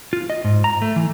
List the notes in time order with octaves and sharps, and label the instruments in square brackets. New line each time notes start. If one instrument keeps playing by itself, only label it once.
[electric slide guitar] F4
D#5
G#2
A#5
A3
E3